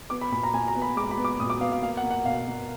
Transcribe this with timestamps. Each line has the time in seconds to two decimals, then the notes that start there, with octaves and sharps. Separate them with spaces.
0.10 B3 D6
0.21 B5
0.32 A#2 B5
0.43 A#5
0.54 A#2 G#5
0.68 A#5
0.76 B3
0.82 B5
0.96 G#3 D6
1.11 B5
1.18 B3
1.25 D6
1.40 A#2 D#6
1.50 D6
1.61 B3 F5
1.72 F5
1.82 A#3 F5
1.97 F#5
2.03 A#3
2.10 F#5
2.25 B2 F5
2.47 A#3